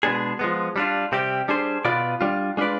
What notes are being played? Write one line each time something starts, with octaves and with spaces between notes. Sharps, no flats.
B2 G#3 B3 D4 G#4
F3 G#3 B3
G3 D4 F4
C3 G3 C4 G4
G3 D4 G#4 C5
B2 B3 F4 B4 D5
G3 D4 F4
G#3 D4 F4 B4 D5